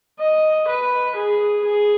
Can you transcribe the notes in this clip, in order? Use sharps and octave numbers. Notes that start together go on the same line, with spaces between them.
D#5
B4
G#4
G#4